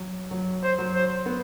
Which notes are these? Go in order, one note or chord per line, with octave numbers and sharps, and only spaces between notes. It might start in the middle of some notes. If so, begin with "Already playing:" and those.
Already playing: F#3
F#3
C5
F#3
C5
B3